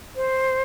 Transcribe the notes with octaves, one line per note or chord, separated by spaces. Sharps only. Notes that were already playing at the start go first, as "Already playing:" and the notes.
C5